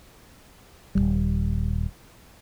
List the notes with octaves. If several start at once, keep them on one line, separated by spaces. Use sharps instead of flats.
D#1 A#1 G3